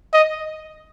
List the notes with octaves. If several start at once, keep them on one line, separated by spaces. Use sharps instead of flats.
D#5